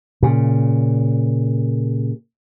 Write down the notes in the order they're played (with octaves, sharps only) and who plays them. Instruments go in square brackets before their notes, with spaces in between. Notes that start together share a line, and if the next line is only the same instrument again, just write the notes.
[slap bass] A#2 C#3